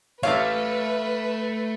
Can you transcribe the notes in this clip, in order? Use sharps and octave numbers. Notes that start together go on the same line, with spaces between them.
A1 A3 E4 B4 C#5 F5 D6